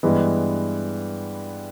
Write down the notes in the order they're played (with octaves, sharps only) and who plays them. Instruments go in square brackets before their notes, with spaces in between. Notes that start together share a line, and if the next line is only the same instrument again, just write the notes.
[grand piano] G2 E3 G#3 B3